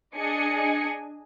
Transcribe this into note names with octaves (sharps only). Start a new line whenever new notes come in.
D4 G#4 D#5 G#5 C#7